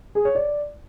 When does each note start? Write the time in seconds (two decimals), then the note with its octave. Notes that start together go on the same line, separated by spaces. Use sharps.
0.15 G#4
0.25 C#5
0.35 D5